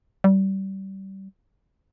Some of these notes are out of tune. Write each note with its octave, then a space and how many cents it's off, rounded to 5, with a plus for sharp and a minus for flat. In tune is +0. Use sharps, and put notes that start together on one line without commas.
G3 -25